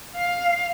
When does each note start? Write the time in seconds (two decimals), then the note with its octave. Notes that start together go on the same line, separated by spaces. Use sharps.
0.16 F5